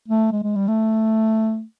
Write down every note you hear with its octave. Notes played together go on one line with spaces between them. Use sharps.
A3
G#3
G#3
G3
A3